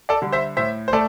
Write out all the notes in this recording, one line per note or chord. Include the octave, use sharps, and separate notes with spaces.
A4 D5
D3 G3
C5 E5
A2 C5 E5
C5
A3 A4 D5